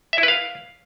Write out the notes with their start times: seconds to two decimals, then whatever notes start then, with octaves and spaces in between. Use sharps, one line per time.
0.13 E5
0.18 E4
0.23 B4
0.28 F5